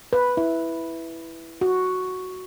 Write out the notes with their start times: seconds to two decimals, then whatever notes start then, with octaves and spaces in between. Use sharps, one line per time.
0.13 B4
0.37 E4
1.61 F#4